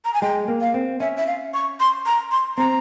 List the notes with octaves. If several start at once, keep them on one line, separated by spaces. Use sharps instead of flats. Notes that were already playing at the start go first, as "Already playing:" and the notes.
A#5
G#5
G#3 G5
A#3
F5
C4
C#4 E5
E5
F5
C#6
C6
A#5
C6
C4 A#5